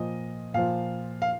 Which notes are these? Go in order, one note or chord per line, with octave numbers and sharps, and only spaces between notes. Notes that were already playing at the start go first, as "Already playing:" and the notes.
Already playing: A#2 F3 D#5
A#2 F3 F5
F5